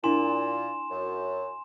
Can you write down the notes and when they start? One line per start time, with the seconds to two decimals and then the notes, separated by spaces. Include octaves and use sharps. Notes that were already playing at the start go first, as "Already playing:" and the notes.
0.04 A#2 D4 E4 G#5 C6 E7
0.91 F#2